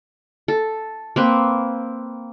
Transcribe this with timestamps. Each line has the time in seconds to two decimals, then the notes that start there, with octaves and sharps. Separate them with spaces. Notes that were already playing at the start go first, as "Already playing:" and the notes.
0.48 A4
1.16 A#3 C4 B4